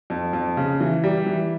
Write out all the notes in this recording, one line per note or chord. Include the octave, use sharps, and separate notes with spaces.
F2
F2
C#3
E3
G3
E3